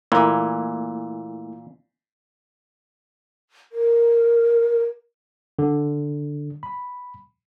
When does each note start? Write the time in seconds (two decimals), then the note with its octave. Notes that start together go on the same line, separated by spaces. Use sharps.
0.12 A#2 E3 A3 A#3 E4
3.72 A#4
5.59 D3
6.63 B5